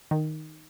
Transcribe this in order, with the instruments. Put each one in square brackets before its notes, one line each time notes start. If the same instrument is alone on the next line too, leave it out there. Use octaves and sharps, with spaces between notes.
[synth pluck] D#3